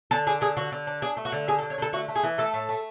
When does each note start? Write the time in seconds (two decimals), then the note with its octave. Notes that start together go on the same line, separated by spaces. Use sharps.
0.11 D3 A4
0.27 D4 G#4
0.41 D3 G#4
0.57 D3 F#4
0.72 D3
0.87 D4
1.02 D4 G#4
1.17 A3
1.25 F#4
1.32 D3
1.48 D4 G#4
1.59 A4
1.63 D3
1.70 C#5
1.78 D3 A4
1.93 A3 F#4
2.08 A3
2.16 G#4
2.23 E3
2.38 A3 A4
2.54 A2
2.69 A3